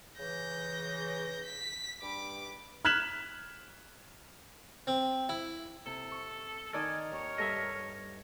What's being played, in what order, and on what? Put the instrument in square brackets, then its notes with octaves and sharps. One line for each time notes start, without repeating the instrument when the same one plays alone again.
[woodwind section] C#3 E3 [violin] G6 A#6
[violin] B6
[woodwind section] G2 B5 [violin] D6
[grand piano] F6 F#6 G#6 B6 E7 F#7
[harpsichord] C4
E4
[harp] C3 [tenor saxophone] A4
[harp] C#6
[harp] D#3 D5 D#6 [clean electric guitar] A4 [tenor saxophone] A#4 [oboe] G#5
[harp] D#2 [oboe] C#5
[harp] G2 A4 F6 [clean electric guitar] D#5 E5